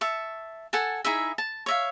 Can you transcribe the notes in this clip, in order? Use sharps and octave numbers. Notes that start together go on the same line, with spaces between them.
E5 A5 C#6
A4 F#5 G#5 A5
D#4 E4 G#4 E5
A5
C#5 E5 F5